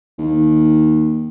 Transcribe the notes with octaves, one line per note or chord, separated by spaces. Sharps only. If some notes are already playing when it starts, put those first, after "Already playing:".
D#2